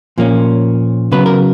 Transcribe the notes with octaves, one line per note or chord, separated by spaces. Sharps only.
A#2 F3 A#3 C#4
C#3 F#3 B3 B4
A#4